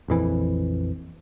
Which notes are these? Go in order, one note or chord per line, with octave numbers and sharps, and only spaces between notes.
A#1 F2 E3